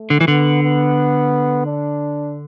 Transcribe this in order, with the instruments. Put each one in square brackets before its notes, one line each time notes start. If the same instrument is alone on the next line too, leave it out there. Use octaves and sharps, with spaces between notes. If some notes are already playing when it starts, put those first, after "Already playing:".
Already playing: [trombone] A3
[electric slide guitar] D3
E3
[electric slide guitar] D3 [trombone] B3
[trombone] B3
D4